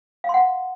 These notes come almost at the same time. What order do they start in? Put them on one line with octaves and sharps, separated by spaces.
F5 C6 F#5